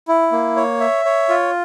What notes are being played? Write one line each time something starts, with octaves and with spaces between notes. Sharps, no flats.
E4
A#3
C#5
E5
C#5
F4